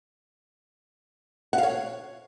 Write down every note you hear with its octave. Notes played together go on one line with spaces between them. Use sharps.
F#5
F5
C#5